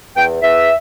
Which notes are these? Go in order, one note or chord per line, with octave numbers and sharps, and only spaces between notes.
E2 G5
E2 E5